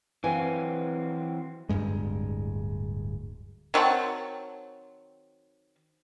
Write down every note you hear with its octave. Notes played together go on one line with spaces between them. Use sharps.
E3 F#3 C4 B4 F5 G#5
D1 A#1 G2 G#3
D#3 F#3 C4 A5